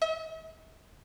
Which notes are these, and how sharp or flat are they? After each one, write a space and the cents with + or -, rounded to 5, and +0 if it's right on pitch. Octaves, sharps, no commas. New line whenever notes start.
E5 -45